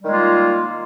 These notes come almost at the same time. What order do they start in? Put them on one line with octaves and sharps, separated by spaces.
G3 D#3 G#3 F4 A#3